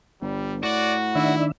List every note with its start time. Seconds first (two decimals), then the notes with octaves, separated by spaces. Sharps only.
0.22 G1 G3
0.63 A2 F#4 D5
1.15 D#3 D4 E4 E5